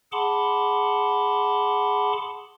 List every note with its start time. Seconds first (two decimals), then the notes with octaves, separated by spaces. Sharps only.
0.12 G#4 F#5 A5 B5 C6 D6